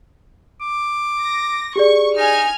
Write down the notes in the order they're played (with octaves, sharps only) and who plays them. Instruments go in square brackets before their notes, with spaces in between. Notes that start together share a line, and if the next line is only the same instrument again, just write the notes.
[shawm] D6
[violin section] A#6
[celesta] G4 G#4 D5 [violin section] C#6
[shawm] D#4 [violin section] G#5 F6